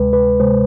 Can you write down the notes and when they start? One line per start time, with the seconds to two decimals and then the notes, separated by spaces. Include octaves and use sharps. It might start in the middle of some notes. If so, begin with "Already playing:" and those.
Already playing: D2 C3 G#3 B4
0.13 B4
0.40 C3 G#3 C5